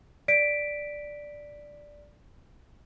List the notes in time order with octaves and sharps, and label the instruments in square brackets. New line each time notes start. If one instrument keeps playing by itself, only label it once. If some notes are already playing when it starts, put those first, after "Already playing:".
[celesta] D5 B6 D7